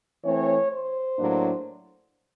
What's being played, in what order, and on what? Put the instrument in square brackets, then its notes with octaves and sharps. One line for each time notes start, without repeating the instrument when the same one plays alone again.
[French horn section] E3 A3 C4 C#5
C5
A2 F#3 A#3 D4